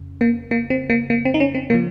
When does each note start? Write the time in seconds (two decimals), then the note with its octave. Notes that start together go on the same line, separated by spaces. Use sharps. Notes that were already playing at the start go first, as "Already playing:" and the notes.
Already playing: F2 C#3
0.21 A#3
0.51 A#3
0.70 C4
0.90 A#3
1.10 A#3
1.25 C4
1.34 D#4
1.40 C#4
1.55 C4
1.70 C#3 F3 A#3